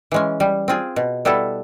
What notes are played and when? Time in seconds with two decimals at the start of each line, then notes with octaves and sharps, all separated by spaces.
0.12 E3 G#3 C#4
0.40 G3
0.68 C4 F4 G#4
0.96 B2
1.25 G3 B3 E4 A4